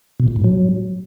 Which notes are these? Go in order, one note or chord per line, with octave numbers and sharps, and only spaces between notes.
B2
A#2
G#2
F#3